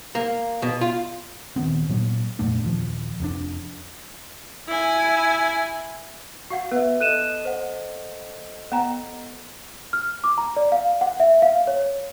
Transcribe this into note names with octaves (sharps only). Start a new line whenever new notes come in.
A#3
B2
F4
D#1 D#3 B3 C4
A#2 F#3 A#3
F2 A#2 A3 D4
D#1 F3
F1 F2 C3 D4
E4 G#5
F#4 F5 F#5
B3 B4 E5
A4 D#5 F#6 D#7 E7
C5 F#5
B3 G5 A#5
F6
D6
A#5
D5
F5
F#5
E5
F5
C#5